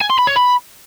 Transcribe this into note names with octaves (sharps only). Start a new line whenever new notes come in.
G#5
C6
B5
C#5
B5